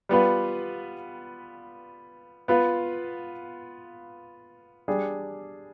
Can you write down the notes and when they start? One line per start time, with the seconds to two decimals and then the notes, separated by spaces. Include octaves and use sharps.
0.09 G3 B3 F4 B4
2.48 B3 F4 B4
4.88 G3 D4 G#4